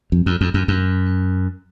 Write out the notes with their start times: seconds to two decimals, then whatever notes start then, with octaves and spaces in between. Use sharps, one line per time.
0.12 F2
0.26 F2
0.41 F2
0.54 F#2
0.68 F#2